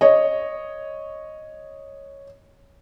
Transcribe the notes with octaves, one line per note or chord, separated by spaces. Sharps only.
C#5 D#5